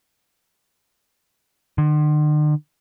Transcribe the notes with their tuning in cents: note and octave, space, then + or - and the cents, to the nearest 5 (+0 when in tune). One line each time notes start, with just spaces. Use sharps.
D3 +45